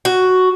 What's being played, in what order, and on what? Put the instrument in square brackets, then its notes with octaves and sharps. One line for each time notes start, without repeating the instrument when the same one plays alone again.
[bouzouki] F#4